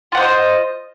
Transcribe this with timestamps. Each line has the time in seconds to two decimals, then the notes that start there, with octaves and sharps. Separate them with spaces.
0.12 F4
0.15 F#5
0.17 C5
0.20 D#5